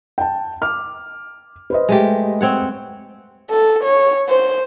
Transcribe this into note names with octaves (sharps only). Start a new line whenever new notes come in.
G5 A5
D6 F6
B4 C5 D#5
G#3 A3 G4
C4 C#5 F#5
A4
C#5
C5